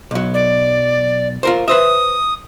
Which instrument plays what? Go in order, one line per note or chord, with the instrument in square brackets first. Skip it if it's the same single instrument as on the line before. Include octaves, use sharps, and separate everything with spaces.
[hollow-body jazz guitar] B1 F#3
[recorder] D5
[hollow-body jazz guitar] F4 A#4 C5
[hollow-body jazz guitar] B4 C5 E5 [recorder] D#6